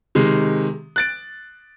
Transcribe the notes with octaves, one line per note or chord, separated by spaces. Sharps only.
C3 D#3 G#3
F#6 A6 D7